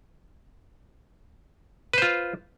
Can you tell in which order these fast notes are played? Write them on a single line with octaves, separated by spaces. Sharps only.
B4 C5 F4